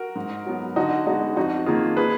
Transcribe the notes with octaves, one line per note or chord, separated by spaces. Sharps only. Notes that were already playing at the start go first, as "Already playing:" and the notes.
Already playing: F#4 A#4
G#2
F#3 B3
D3 D#4 F#4
G#3 B3 D#4 F#4
F2 D#4 F#4
D#3 A#3 F4 G#4
G#4 B4